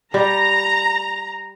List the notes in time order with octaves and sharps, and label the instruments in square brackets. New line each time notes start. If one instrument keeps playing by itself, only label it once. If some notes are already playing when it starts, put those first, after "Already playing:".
[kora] G3 [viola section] A#5